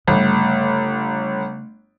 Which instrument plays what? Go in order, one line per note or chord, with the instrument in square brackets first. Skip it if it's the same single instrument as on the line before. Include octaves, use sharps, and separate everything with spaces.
[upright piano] G1 [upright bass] C#3 A3